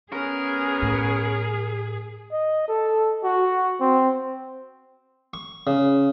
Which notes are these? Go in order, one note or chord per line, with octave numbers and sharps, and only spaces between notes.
B3 C#4 G#4 A#4
A2
D#5
A4
F#4
C4
C#6
C#3